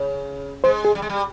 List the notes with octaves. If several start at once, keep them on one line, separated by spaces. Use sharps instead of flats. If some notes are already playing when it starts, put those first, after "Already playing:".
Already playing: C#3
G#3 C5
G#4
G3
G#3
G3